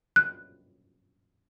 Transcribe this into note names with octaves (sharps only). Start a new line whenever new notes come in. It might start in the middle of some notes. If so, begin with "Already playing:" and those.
F#6